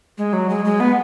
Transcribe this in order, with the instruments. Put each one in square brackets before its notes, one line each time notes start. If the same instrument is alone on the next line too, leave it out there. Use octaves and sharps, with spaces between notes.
[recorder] G#3
F#3
G#3
G#3
B3